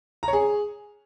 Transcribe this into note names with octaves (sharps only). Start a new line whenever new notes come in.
A#5
C#5
G#4